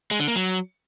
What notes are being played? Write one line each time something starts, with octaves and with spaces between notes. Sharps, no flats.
G#3
D3
A#3
F#3